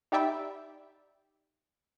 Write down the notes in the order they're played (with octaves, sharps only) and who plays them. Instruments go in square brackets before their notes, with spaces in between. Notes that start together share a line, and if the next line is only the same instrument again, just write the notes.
[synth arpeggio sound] D#4 G4 D5 E5 G5 B5